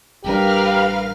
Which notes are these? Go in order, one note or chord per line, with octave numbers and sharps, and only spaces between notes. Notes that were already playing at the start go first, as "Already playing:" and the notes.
A1 G3 D4 G4 A#4 B4 F5 F6